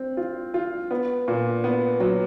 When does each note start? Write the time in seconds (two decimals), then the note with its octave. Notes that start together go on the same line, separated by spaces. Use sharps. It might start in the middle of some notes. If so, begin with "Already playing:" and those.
Already playing: C4
0.17 F4
0.54 F4
0.91 B3
1.28 A#2
1.64 B3
2.00 F#3